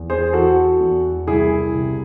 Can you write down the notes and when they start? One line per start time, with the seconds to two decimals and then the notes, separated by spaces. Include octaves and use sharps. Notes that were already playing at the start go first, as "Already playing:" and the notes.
Already playing: E2
0.10 G#4 C5
0.33 E3 F#4 A4
0.80 E2
1.27 C2 E4 G#4
1.75 C3